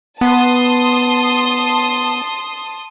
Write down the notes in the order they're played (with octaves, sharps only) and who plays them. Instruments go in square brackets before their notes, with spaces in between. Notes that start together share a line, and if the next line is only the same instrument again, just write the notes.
[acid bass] B3 [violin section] A5 C6 D#6